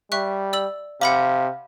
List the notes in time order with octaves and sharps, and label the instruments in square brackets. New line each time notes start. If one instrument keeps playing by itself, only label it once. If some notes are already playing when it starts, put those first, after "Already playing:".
[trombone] G3 [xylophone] E5 C#6 F#6
[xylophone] D5 E6 F#7
[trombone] C3 [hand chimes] F5 [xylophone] F#5 B5 D6